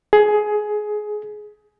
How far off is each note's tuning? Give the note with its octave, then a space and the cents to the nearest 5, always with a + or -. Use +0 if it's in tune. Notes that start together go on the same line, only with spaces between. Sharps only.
G#4 +20